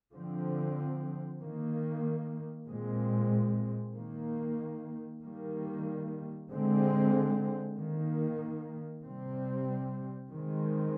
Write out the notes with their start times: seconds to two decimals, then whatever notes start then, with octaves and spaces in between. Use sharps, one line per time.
0.13 D3 F3 C4
1.41 D#3 A#3
2.68 A#2 G#3 C4
3.95 D#3 A#3
5.23 D#3 G3 A#3
6.50 D3 G#3 C4
7.78 D#3 A#3
9.05 C3 G3 C4
10.32 D#3 G#3 C4